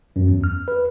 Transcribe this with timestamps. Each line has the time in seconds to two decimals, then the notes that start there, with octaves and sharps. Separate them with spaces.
0.16 F#2
0.28 E2
0.44 F6
0.68 B4